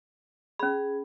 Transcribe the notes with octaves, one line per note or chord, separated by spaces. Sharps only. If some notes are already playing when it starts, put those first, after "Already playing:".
C#4 G#4 B5